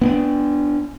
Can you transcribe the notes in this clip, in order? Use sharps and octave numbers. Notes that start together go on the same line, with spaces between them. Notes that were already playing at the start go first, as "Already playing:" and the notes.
B3 C#4 D4